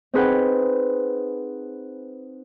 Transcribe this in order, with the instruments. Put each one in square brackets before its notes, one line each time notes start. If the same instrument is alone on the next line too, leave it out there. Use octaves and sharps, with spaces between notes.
[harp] C4 D#4 G#4 B4 F#5 G5